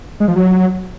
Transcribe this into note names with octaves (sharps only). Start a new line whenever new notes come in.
G#3
F3
F#3